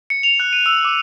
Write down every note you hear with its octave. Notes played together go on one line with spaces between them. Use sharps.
C#7
F7
F#6
D#7
E6
D6